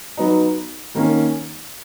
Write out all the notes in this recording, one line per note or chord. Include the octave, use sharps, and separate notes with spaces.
F#3 B3 D#4
D#3 A#3 C#4